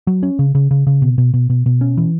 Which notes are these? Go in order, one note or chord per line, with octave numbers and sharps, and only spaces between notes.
F#3
C#4
C#3
C#3
C#3
C#3
B2
B2
B2
B2
B2
C#4
E3